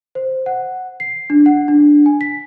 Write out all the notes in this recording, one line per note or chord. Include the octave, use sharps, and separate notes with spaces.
C5
F#5
C7
D4
F#5
D4
G#5
B6